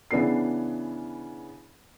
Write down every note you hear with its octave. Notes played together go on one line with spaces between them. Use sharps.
C#3 E3 B3 D4 C7